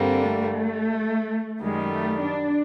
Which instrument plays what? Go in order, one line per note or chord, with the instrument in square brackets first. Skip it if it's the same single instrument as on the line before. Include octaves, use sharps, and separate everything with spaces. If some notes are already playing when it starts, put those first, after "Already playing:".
Already playing: [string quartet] G2 D3 G3 A#3 [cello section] C4
[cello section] A3
[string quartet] F#2 D#3 G3 [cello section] G#3
[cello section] A3
D4